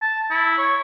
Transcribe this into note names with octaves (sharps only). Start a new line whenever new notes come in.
A5
E4
C#5